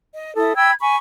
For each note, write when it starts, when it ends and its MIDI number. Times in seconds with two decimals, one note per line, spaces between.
0.14 0.34 75
0.37 0.56 64
0.37 0.56 69
0.37 0.56 87
0.56 0.73 79
0.56 0.73 83
0.56 0.73 88
0.56 0.73 92
0.81 0.96 80
0.81 0.96 83
0.81 0.96 85